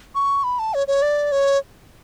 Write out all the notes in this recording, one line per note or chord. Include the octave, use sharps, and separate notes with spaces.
C#6
B5
A5
C#5
C#5
D5
C#5